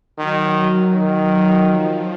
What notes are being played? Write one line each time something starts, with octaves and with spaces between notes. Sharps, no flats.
D#3 F#3
D#3
F3